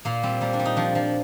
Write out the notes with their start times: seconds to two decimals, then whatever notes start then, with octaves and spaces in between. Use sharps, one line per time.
0.05 A#2 A#3
0.23 G3 C4
0.41 G3 A#3
0.53 D4
0.59 G3
0.65 D#4
0.76 F3 D4
0.95 F3